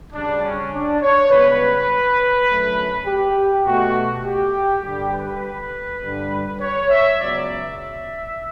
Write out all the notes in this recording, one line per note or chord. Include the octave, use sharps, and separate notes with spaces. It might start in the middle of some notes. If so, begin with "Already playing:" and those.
D2 C#3 G3 D4
C#4
D4
C#5
C#2 C#3 G3 B3 B4
F#2 D3 F#3 A3
G4
B2 A3 F#4
G4
G2 D3 G3 G4
B4
G2 D3 G3
C#5
E5
C#2 C#3 F#3 B3 D5
E5